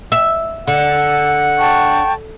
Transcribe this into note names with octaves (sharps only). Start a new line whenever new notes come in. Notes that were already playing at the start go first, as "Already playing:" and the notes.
E5
D3 F#5
G5 A5 C#6